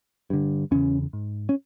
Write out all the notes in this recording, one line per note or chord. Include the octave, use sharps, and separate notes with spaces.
G2 D3
E2 C#3 C#4
G#2
C#4